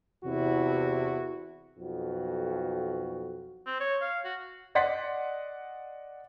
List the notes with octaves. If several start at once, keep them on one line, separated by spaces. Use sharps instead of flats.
E2 C3 E4 F#4
B1 F2 F#4
C4
C#5
F5
F#4
D5 D#5 F#5 C6 A6 B6